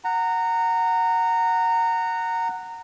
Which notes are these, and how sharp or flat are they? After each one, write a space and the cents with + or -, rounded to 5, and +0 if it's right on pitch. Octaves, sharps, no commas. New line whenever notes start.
F#5 +0 A#5 -20